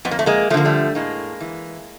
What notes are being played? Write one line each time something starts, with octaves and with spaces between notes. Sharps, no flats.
F2 B3
A#3
A3
G#3 A#3
D3 F3 A3 A#3
G3 A3
A2 G#3 A#3
E3